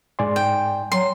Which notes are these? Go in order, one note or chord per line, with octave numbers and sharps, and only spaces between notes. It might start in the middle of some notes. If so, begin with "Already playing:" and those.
G#2 D5 G#5 C6
G5
F#3 C6